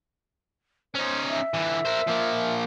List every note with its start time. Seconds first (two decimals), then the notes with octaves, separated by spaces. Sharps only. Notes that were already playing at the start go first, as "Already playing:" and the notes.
0.95 C#4 D#4 C5
1.29 E5
1.54 D3 E3
1.85 A#4 C5
2.07 F3 A#3